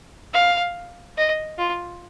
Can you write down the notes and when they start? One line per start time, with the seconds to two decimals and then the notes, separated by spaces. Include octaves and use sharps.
0.34 F5
1.17 D#5
1.58 F4